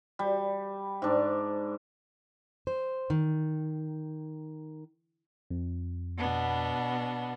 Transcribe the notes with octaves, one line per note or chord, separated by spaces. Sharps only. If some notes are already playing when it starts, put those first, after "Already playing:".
G3
G#2 D4
C5
D#3
F2
B2 B3 D4